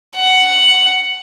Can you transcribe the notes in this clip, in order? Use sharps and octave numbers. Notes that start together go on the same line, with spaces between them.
F#5